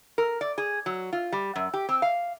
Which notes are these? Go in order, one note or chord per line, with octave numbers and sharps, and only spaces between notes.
A#4
D5
G#4
F#3
F4
G3
F#2
G4
C4
F5